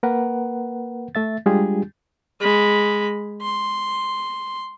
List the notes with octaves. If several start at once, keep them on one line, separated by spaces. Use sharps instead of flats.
A#3 A#4 B4 F#5
A3 E5 A6
G3 G#3 D4 F4 G4 G#4
G#3 B5
C6